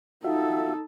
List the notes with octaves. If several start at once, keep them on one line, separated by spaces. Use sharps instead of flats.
D#4 F4 F#4 A4 E5